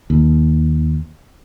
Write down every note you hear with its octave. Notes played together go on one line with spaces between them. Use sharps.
D#2